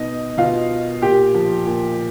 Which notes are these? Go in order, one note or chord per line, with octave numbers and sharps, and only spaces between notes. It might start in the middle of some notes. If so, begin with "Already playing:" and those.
Already playing: B2 D#4 D#5
B2 F4 F5
A#2 G4 G5
F3
A#2